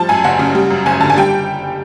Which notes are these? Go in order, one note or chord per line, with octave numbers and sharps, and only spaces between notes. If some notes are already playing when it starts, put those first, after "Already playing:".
Already playing: F3 G3 A5
F#2 G#5
F#1 F#5
C#3
G3
F#2
F#1 G#5
D3 A5
G#5
G3 G5